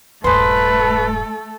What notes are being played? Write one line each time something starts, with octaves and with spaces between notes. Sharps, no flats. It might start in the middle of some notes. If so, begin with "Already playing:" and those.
D#1 G2 A3 G#4 A4 B4 C5